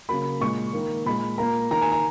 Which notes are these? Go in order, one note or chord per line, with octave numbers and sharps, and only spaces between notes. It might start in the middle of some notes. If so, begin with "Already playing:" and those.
C#3 F#3 A#3 B5
A#2 G#3 C#6
D#3 A#3
A#2 G#3 B5
A#2 A#3 A#5
D#3 A#3 A#5
G#5
A#5